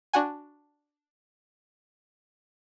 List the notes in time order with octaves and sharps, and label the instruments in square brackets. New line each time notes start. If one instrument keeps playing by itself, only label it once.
[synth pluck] D4 F#4 F#5 G#5